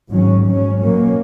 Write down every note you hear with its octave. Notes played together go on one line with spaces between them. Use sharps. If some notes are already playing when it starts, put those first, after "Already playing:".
G#2 D#3 F#3 C#4
G#2 F#3 C#4
B2 F#3 A#3 C#4